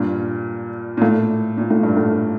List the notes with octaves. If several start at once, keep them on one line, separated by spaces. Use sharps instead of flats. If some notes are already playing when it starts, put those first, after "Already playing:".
Already playing: G2 A#2
A#2
A2
A#2
A2
G2
A2